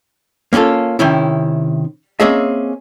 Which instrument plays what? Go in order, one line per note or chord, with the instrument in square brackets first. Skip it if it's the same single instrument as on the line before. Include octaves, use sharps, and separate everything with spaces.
[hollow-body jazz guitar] A#3 C#4 D#4 F4 A4
C3 D#3 C#4 E4
A#3 C4 C#4 G#4 D#5 E5